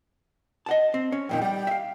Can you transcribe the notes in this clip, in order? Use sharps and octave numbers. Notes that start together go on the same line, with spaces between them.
D#5 F#5 A5
C4
C#4
F2 A#2 D#3 G5
G3 G5
E5 F5